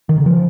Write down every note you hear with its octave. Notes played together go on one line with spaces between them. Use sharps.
D#3
C#3
F3